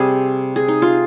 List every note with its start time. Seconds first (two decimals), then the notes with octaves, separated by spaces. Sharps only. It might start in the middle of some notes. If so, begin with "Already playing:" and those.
Already playing: C3 G3 C4 G#4
0.56 G#4
0.68 D#4
0.82 F4